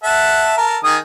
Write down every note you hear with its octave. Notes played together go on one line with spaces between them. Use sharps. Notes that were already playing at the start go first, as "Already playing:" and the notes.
A4 E5 F#5
A4 A#4
D#3 G#4 D#6